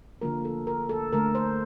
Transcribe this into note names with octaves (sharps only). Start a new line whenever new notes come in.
D3 F3 A#3 A#4
A4
A#4
A4
D3 A3 A#4
C5